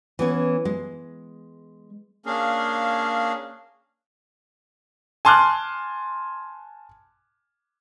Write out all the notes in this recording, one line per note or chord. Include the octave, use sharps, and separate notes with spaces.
E3 B3 C#4
G#3
A#3 C#4 D4 G#4 F5
G#5 A5 C6 D6 F6 F#6